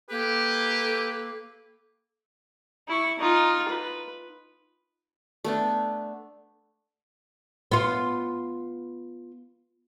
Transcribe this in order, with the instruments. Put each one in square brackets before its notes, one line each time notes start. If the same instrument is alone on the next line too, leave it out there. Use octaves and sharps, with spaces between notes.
[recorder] A#3 [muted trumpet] G4 [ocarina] A4 [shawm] B4
[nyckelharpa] E4 C#6
D#4 F4
B4
[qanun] A3 B3 D4
[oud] B3 F4